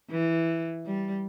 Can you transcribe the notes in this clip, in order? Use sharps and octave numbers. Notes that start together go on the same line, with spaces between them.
E3
G3